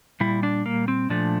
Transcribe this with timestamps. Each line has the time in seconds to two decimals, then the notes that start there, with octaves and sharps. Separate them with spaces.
0.20 A#2 G3 E4
0.43 D4
0.66 A#3
0.88 C4
1.10 A#2 F3 A3 D4